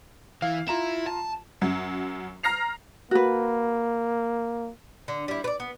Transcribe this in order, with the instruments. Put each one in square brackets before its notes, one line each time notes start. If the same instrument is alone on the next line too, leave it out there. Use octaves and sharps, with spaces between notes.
[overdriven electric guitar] E3 [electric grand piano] F5
[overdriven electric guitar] E4 [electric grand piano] F4 A#5 E7
[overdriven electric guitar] A5
[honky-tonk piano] F#2 F#3
A#5 F6 A#6 C7 F7
[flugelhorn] A#3 [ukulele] F#4 B4
[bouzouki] D3
G3 E4
B4 D5
B3